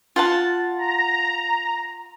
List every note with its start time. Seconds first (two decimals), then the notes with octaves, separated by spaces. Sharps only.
0.16 F4 F#5 A5
0.78 A#5